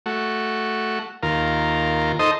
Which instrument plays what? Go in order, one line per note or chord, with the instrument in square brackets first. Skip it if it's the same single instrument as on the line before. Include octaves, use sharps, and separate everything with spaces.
[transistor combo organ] A3 F#4
D#2 F4 A#4
D#4 A4 C5 D#5